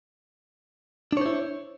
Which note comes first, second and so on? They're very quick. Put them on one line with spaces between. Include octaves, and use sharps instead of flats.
D4 C#5 C5 E4